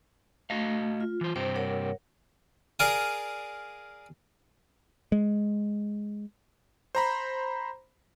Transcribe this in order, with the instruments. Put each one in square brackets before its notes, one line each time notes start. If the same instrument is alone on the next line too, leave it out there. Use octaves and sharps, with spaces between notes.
[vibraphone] A3 [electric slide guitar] F#4 D#5 F5
[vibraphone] F4
[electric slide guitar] E3 C5
[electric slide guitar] G2 C3 G4 [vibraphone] C5
[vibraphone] A#4 C#5 F#5
[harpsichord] G#4 A#4 D5 F5 G#5
[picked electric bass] G#3
[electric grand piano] C5 A#5 B5